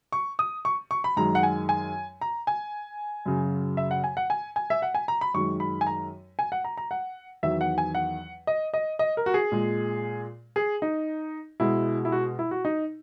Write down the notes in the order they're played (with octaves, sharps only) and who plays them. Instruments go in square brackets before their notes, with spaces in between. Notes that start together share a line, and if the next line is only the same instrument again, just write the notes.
[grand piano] C#6
D#6
C#6
C#6
B5
F#2 D#3 G#3 A#5
F#5
G#5
G#5
A#5
G#5
F#2 C#3 F#3
E5
F#5
G#5
F#5
G#5
G#5
E5
F#5
G#5
A#5
B5
F#2 D#3 G#3 C#6
B5
G#5
A#5
G#5
F#5
A#5
A#5
F#5
E2 D#3 F#3 E5
F#5
G#5
F#5
D#5
D#5
D#5
A#4
F#4
G#4
A#2 G#3
G#4
D#4
B2 G#3 E4
E4
F#4
E4
F#4
D#4